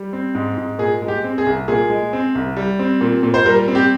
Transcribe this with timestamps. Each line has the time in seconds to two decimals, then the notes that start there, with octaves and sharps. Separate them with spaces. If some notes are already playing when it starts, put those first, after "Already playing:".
Already playing: G3
0.13 C4
0.35 G#2
0.57 G#2
0.79 A#2 G#4
1.02 G#3
1.08 G4
1.24 C4
1.38 G#4
1.46 C2
1.68 A#2 G#4
1.90 G#3
2.13 C4
2.35 C2
2.56 G3
2.79 C4
3.01 A#2
3.23 A#2
3.34 C5
3.46 G3 A#4
3.68 C4
3.75 G4